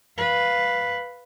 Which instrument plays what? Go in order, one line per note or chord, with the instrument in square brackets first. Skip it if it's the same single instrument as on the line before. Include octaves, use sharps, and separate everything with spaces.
[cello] B4 F5